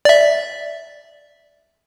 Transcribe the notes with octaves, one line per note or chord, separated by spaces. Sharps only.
D5 E5